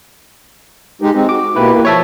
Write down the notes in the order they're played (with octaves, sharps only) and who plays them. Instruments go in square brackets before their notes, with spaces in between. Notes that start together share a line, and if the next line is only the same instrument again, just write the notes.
[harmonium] G#3 D#4 G4
G#3 C4 D#4
[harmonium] F#4 [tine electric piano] D6
[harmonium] B2 A#3 G4 [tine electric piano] E4 B4
[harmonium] A#3
[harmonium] F3 [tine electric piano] C#5 E5 A5